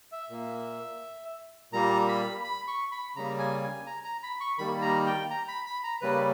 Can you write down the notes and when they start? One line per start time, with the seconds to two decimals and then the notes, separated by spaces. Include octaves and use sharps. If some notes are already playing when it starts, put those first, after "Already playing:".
0.12 E5
0.29 A#2 A#3
1.72 A#2 G3 A#3 A#5
2.08 B5
2.44 B5
2.68 C#6
2.92 B5
3.16 C#3 G3 A#3 A#5
3.39 G#5
3.64 G#5
3.87 A#5
4.05 A#5
4.23 B5
4.41 C#6
4.58 D#3 G3 A#3 B5
4.82 A#5
5.07 G5
5.30 A#5
5.48 B5
5.66 B5
5.84 A#5
6.01 C#3 G3 A#3 B4